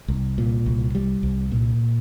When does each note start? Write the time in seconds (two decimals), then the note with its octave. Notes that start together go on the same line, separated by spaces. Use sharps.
0.08 C2
0.38 A#2
0.66 C2
0.95 G3
1.23 C2
1.52 A#2